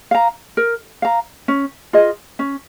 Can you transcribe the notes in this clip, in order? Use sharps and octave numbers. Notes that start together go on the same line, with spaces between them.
F5 A#5
A#4
F5 A#5
C#4
F4 G#4 D#5
C#4